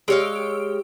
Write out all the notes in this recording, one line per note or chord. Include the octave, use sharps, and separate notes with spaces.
G#3 G4 C#5 F5 E6 D7